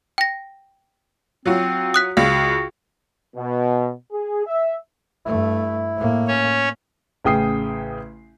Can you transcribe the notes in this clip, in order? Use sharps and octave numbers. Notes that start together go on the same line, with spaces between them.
G5 A#6
F#3 C4 F4 F#4
D#6 F#6 B6
C#2 F#4 F5
B2
G#4
E5
G2 A3 E4
A2 A#3
C#4 C#5
A1 C#3 G5 D#6 C7